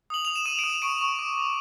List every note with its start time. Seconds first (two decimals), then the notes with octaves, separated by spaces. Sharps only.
0.10 D#6 F#7
0.25 D#6 F7
0.35 E7
0.45 D#6 D#7
0.59 D7
0.64 D#6
0.70 D#7
0.82 C#6 D7
1.01 C#6
1.19 D6
1.38 D6